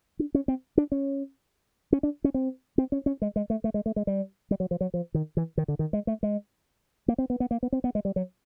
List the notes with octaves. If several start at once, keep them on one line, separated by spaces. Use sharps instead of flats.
D4
C#4
C4
D4
C#4
C#4
D4
C#4
C4
C4
C#4
C#4
G#3
G#3
A3
A3
G#3
A3
G#3
G3
G3
F#3
F3
F#3
F3
D#3
E3
D#3
D3
D#3
G#3
A3
G#3
A#3
C4
B3
B3
A#3
B3
C4
B3
G#3
G3
F#3